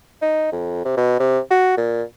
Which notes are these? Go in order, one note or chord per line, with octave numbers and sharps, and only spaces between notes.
D#4
F2
C3
B2
C3
F#4
A#2